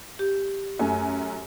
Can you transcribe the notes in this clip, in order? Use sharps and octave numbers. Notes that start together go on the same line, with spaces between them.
G4
F#2 A3 G#5